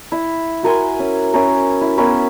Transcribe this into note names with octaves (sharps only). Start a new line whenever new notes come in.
E4
F#4 A#4 G#5 C6
C#4
C#4 E4 A#4
E4
B3 C#4 E4 A#4